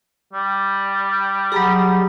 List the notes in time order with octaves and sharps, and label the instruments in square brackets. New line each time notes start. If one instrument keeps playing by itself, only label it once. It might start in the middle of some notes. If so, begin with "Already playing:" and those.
[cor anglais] G3
[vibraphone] F#3 G4 [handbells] G#4 A#5 B5